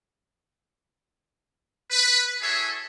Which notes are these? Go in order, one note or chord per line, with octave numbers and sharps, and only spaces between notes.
B4
E4 F#4 G#4 A4 C#5 E5